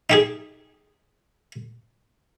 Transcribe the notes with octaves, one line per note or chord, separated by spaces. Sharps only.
D#4 G4 G#4